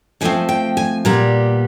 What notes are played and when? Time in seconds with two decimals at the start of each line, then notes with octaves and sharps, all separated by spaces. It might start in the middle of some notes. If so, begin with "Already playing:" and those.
0.21 G#2 F3 A3 C4 G#5
0.49 G5
0.77 G#5
1.05 A#2 G3 B3 A#5